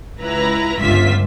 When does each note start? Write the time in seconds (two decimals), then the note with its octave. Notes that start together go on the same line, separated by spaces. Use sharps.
0.20 C#2 E4 B4 A#5
0.80 G1 C#2 G2 F4 E5 B6